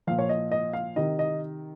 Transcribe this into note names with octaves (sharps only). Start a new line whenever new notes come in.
A#2 F3 F5
C#5
D#5
D#5
F5
C3 D#3 D#5
D#5